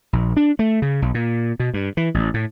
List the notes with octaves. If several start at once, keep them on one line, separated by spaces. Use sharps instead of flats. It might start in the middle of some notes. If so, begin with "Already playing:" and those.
A#1
D4
A3
C#3
B1
A#2
B2
G2
E3
A1
A2